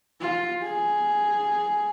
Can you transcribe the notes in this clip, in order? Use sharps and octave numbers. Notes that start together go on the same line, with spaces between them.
F4
G#4